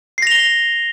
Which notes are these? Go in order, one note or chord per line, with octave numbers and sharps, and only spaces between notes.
A#6 C7 F7 G7